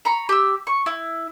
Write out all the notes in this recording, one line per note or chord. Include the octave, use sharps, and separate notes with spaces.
A#5 B5 C#6
G4 E6
C#6
E4